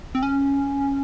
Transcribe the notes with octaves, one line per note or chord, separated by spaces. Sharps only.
C4
C#4